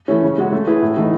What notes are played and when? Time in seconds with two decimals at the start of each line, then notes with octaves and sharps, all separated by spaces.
0.08 E3 A3 C#4
0.23 C#3
0.38 G#3 C#4 F#4
0.52 A3
0.67 E4 G#4 B4
0.82 A2
0.97 E3 A3 D#4